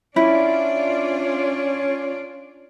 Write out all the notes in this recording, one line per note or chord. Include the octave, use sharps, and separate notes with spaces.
C#4 D4 E4 F4 D5